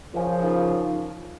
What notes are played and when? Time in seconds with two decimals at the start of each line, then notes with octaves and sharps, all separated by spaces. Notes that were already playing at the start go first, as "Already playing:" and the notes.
0.13 C#3 F3 F4 A#4 F5 G#5
0.43 D#4 A#4 F5